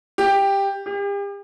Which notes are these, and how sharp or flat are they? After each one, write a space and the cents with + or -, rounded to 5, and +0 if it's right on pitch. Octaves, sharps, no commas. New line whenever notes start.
G4 +10
G4 +40